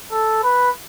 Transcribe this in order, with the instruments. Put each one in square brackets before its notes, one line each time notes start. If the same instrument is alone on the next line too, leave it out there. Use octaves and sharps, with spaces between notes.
[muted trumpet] A4
B4